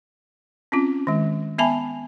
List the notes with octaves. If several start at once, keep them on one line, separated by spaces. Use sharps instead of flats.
C4 C#4 F4
D#3 G#3
B3 E5 G#5 A5 B5